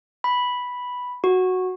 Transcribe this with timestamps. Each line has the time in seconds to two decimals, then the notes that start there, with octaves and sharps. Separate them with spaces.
0.24 B5
1.24 F#4